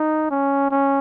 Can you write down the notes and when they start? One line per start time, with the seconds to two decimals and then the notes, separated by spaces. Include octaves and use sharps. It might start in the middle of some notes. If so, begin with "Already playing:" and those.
Already playing: D#4
0.31 C#4
0.71 C#4